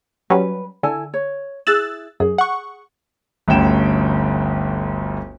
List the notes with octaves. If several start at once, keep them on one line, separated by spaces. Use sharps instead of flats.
F#3 G3 C#4 B4
D3 E4 A4 G#5
C#5
E4 G#4 E6 F#6 A6
F#2 G#4
F#5 C#6
G1 D2 C#4 G5 E7